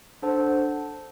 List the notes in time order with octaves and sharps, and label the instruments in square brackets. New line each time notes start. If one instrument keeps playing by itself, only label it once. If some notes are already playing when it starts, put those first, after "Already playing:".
[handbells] D4 A4 C5 F#5 A5